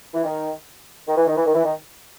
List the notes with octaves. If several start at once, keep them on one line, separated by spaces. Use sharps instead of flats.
E3
D#3
D#3
E3
D#3
E3
D#3
E3
D#3